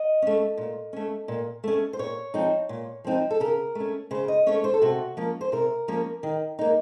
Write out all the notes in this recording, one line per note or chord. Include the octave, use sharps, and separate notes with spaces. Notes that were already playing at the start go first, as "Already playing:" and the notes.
Already playing: D#5
A3 C#4
A#2
A3 C#4
A#2
A3 C#4
C5
A#2 C#5
F3 C4 D#4
A#2
F3 C4 D#4
A4
C#3 A#4
A3 C#4
C#3 C5
D#5
A3 C#4 C#5
C5
A4
C3 F#4
F3 A#3 C#4
C5
C3 A#4
F3 A#3 C#4
D#3
A#3 D#4